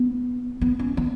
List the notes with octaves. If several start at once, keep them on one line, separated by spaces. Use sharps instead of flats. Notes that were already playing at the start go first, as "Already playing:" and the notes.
Already playing: B3
B3
C#4
B3